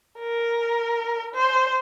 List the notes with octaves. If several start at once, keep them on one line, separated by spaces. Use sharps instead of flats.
A#4
C5